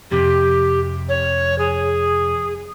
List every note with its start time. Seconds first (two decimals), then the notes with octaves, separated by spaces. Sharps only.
0.11 F2 C3 G4
1.09 C#5
1.59 G#4